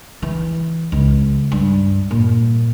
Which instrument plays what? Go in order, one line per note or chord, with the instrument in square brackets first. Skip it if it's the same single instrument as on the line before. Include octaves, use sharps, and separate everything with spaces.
[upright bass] E3
C#2
G2
A#2